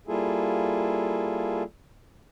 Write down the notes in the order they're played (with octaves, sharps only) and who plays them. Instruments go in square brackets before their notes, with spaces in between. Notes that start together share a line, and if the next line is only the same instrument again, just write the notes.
[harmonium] G3 A#3 E4 F4 G#4 A4